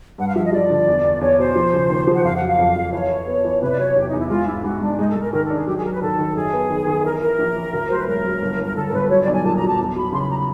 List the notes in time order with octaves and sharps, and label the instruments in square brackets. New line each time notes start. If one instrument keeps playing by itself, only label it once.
[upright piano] G2 [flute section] F#5
[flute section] F5
[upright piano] F3 [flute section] E5
[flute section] D#5
[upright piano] F3 [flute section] D5
[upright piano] D3
E2
E2
[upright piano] E2 [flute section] C#5
[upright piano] B2 [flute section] C5
[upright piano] F3
C#3
D#2
F3
[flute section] F#5
[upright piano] F2 [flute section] F5
[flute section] F#5
[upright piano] F#3
[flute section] F5
[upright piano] F2
F2
[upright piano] E3 [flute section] C#5
[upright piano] E3
B3
E3
[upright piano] C3 [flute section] B4
[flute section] D5
[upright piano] F#3 [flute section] C#5
[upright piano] E2 [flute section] G4
[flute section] D#4
[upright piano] E2
[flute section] E4
[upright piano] G#3 [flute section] F4
[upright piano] G#2 [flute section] E4
[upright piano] G#2 [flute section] F#4
[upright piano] G#2 [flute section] D4
[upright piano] G#3 [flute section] D#4
[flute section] A4
[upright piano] G#3
[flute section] A#4
[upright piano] D#3 [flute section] A#4
[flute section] A4
[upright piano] D4
[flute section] G#4
[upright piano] F#3 [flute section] G4
[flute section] G#4
[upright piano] F#3 [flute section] A#4
[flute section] B4
[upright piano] D#3 [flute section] A4
[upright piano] D#3
[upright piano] F#2 [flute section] G#4
[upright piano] B3
D#3
D#3
[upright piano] E3 [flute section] A#4
[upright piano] E3 [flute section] A#4
[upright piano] A#1
E3
D2
[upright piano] F#3 [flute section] C5
[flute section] B4
[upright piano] E1 [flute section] A#4
[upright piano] F#3
G1
G1
[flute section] A#4
[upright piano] D3 [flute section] A4
[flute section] A#4
[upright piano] G1 [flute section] B4
[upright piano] F#3 [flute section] C#5
[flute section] D5
[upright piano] B1
[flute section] G#5
[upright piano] A#2 [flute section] A5
[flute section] A#5
[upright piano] F#3
[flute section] A5
[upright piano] E2
[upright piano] F#3 [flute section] B5
[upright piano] C#3 [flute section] C6
[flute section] B5
A#5
B5